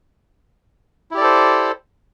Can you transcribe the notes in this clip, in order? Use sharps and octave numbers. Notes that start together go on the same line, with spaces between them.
E4 G4 A4 C5 D5